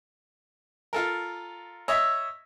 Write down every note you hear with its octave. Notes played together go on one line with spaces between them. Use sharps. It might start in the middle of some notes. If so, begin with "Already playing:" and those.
F4 A4 A#4
C#5 D#5 E5 E6